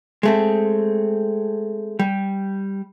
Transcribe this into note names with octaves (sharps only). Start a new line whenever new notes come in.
G#3 A3 C4
G3